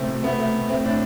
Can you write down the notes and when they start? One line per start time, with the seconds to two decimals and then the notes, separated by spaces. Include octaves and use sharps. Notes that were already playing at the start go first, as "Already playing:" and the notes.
Already playing: C2 A3 C4
0.09 B2
0.23 A3 B3
0.38 A3
0.54 B2
0.69 A3 C4
0.84 A2 D4